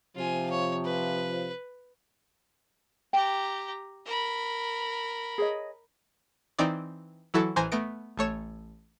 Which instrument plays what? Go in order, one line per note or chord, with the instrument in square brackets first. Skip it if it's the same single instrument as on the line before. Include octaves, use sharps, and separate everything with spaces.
[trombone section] C3 F3 [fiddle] F4 G#5
[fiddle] C#5
B4
[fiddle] G4 A#5 [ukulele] G5
[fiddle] A#4 B5
[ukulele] G#4 C#5 D#5
[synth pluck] E3 C4 D#4 D5
E3 F#3 E4 F#4 A4
A1 E3 C5 G#5 A#5
A3 B3 A#6 D7
A1 A3 C#5 E7